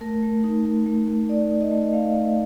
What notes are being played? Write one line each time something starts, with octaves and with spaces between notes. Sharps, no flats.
A3 A#4
A3
D#4
A3
A3
A3
D#4 D5
D#4
D#5
A3
D#5
A3 F5
A3